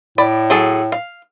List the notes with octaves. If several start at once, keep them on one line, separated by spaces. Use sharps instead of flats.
A2 D5 B5
F#3 G#4 A4
F5